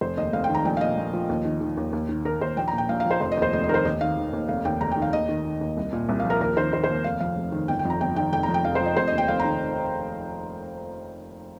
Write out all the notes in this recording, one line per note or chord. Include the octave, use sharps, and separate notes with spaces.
F1 C5
D#2 D#5
F1 F5
G5
D#3
A#5
A#1 G5
F5
A#2 D#5
A#1
F3
D#2
D#3
D#3
D#2
D#2
D#3
D#3 A#4
D#2 C5
A#1 G5
A#5
A#2
G5
A#1 F5
F5
F3
C5
F1 C5
D#5
D#2
C5
F1 D#5
D#5
D#3 A#4 C5
D#2 D#5
D#3 F5
D#3
D#2
F1 F5
D#2 G5
F1 A#5
G5
D#3
F5
D#2 D#5
D#3
D#3
D#2
C2
A#2
C2
F5
F3
A#4
D#2 A#4
D#3 C5
D#3 C5
C5
D#2
F1 F5
F2 F5
F1
D#3
G1 G5
G5
F2
A#5
G1 G5
D#3 G5
F1 G5
A#5
F2
G5
F1 F5
C5
F3 D#5
F1 C5
D#2 D#5
G5
F1 F5
D#3 A#5